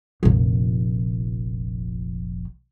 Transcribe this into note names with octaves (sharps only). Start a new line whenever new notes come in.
F1 A#1